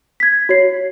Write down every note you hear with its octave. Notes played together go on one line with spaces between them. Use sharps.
G#6 B6
F#4 C#5 C7